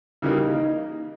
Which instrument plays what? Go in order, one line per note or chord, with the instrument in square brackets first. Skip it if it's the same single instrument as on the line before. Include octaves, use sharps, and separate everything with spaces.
[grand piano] C#3 E3 G3 A#3 [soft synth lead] D#4